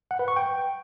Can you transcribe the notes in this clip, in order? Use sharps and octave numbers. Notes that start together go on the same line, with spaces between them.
F#5
B4
C#6
G5